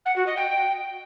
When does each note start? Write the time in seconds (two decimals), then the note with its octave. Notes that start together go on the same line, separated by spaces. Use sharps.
0.05 F#5
0.16 F#4
0.26 D#5
0.36 G5